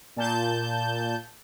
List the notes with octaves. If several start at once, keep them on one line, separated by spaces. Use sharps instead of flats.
A#2 A5 G6